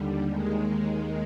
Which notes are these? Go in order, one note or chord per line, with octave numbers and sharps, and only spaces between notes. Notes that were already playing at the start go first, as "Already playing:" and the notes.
Already playing: D#2 D3 G3
D#2 D#3 G#3